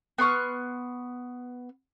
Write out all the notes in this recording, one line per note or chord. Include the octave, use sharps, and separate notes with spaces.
B3 C6 C#6 F6